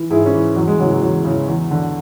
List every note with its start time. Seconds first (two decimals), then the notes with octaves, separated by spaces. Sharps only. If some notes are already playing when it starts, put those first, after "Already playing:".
Already playing: E3
0.10 G#2 E4 G#4
0.26 C#4 E4
0.34 E3
0.56 E2 F#3
0.67 G#3
0.79 C#3 E3 F#3
0.91 F#3
1.02 E2 F#3
1.25 C#3 E3
1.48 E2
1.71 D3